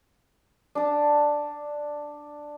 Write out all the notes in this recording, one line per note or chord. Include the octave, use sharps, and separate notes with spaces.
D4 A5